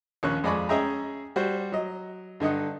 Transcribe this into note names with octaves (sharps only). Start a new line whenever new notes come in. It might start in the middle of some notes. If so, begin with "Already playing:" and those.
A#1 D#2 C#4 C#6 F#6
F2 G#3 D5 G#5 B5 C#6
C#4 G#4 D#5 E5 G5 A#5
G3 F#4 C5
F#3 D#5
G2 D3 D#4 F#5 D#6